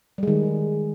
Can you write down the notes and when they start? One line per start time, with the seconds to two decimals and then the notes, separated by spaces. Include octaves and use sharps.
0.18 G3
0.23 G#3
0.27 D#3